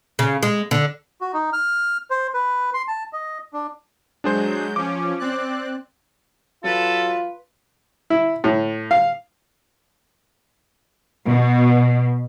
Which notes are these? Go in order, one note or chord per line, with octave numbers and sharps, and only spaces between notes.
C#3
G#3
D3
F#4
D#4
F6
C5
B4
C6
A5
D#5
D4
F#3 G#3 D4 G#4 C5 G6
F3 C#4 D6
C4 D5 F#6
F#3 F4 A4 B4
E4
A2
F5
B2